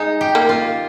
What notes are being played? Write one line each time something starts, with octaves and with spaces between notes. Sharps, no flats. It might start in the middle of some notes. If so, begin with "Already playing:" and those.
Already playing: G#3 D#4
G4
A#3
F4